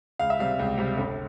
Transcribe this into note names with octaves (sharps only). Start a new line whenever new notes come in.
C#2 F5
E5
C3 G3 F5
C#2
C3 G3
G1